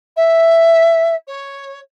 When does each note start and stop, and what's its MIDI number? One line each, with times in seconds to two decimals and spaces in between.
0.16 1.15 76
1.27 1.80 73